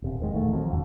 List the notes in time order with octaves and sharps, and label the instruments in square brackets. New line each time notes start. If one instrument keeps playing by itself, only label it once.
[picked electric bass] D#1 C3
F1 D#3 G#3
E1 A#1 D#3 A3
D#3 F3 F#3 C4
E1 D#2 G#2 D3